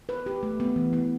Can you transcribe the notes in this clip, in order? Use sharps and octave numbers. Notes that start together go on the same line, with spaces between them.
B4
G4
A3
B3
E3
B3